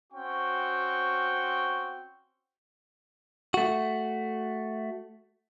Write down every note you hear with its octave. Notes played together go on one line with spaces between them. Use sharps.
C4 C#4 F#4 G5 C#6
A3 F#4